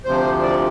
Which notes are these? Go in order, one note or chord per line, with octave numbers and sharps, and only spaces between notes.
D2 C3 F3 C5
D5